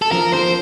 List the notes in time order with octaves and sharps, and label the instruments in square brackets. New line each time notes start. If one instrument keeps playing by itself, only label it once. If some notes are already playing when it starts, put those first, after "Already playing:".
[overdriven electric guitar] A4
[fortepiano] F3 [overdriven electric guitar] A#4
[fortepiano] F3 [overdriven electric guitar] C5